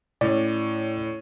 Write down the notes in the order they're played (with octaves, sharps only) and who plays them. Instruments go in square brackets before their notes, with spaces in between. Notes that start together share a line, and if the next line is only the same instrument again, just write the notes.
[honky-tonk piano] A2 C#4 [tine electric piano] D5